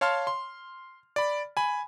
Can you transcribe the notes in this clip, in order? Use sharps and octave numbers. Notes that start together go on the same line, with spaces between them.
C#5 F5 A5 C6 F6
C6
D5 B5
G#5 B5